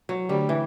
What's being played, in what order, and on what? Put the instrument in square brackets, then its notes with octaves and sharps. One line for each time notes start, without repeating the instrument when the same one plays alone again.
[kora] F#3
[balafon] D3 A3 D4 G4 C5 [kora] G3
[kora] E3